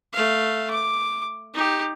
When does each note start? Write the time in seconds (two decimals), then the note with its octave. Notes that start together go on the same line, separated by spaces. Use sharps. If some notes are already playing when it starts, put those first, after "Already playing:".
0.13 A3 F5
0.70 D6
1.54 D#4 G4